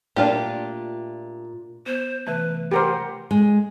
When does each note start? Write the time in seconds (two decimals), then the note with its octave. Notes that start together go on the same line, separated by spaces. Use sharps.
0.16 A#2 A3 D4 F4 G4
1.86 B3 C5
2.27 C3 E3 A3 B4
2.72 G4 A#4 C5 F#5
3.31 G#3